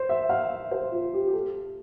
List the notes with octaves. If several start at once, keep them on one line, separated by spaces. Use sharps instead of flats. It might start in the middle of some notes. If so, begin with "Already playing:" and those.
Already playing: C5
E5
F5
E5
C5
F4
G4
G4
A4